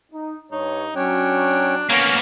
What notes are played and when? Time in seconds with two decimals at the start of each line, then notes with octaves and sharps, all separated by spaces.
0.12 D#4
0.52 G2 D#4 C#5
0.96 F#3 C#4 D4 C#5 G5
1.90 A#3 B3 C#4